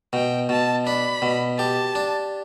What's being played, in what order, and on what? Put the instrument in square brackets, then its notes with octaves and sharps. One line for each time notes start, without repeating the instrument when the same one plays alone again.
[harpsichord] B2 [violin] G5
[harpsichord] B2 [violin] A5
[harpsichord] D4 [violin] B5
[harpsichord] B2
[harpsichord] G4 [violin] A5
[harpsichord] D4